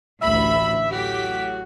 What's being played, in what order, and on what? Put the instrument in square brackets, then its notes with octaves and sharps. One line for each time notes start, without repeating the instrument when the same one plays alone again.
[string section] A1 D2 B5 [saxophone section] E5
[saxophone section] A2 F#3 F#4 [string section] G4 B6